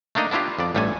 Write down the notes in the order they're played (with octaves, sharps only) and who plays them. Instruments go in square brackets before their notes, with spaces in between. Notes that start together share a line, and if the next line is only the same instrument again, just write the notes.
[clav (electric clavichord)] A3 A#3 D4 D#4 D#5
B3 D4 E4 F4 G4
F2 D5
A1 G2 G3 A3 A4 G#5